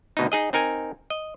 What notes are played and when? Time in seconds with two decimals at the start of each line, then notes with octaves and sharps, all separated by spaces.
0.17 D2 B2 D#4
0.32 D#4 G#4 D#5
0.53 C4 D#4 A#4 G#5
1.10 D#5